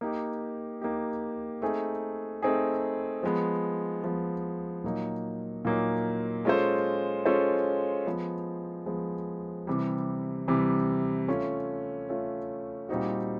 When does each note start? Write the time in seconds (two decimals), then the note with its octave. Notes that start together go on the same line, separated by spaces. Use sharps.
0.01 A#3 D#4 G4
0.81 A#3 D#4 G4
1.62 A3 C4 D#4 G#4
2.43 A3 C4 D#4 G#4
3.23 F3 G#3 B3
4.04 F3 G#3 B3
4.84 A#2 F#3 A#3 D#4
5.65 A#2 F#3 A#3 D#4
6.45 G#3 C#4 F4 A4 C5
7.25 G#3 C#4 F4 A4 C5
8.06 F3 G#3 B3
8.86 F3 G#3 B3
9.67 C3 E3 G3
10.48 C3 E3 G3
11.28 A3 C#4 F4
12.09 A3 C#4 F4
12.89 A#2 G3 C4 D#4 F#4